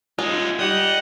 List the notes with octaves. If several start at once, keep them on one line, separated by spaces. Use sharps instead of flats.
G#3 D#4 F4
G3 D#5 F#5